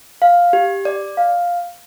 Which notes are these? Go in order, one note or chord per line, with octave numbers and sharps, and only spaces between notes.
F5
G4
D5
F5